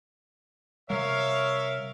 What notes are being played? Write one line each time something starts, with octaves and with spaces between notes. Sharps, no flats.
C3 G3 A#4 C#5 E5 F5